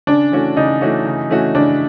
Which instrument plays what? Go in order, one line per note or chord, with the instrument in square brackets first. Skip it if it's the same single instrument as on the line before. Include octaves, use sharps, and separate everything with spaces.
[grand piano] C#3 [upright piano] D4
[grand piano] E3 A3 C#4 F#4
[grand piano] C#3 [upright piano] D#4
[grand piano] E3 A3 C#4 F#4
C#3
E3 A3 C#4 F#4
[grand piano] C#3 [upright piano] D4